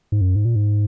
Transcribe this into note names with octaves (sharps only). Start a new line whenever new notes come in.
G#2
F#2
G#2
A#2
G#2